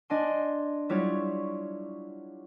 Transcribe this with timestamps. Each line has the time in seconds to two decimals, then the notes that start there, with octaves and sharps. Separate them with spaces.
0.10 D4 D#5 G#5 C6
0.89 F#3 G3 E4 F4 C#5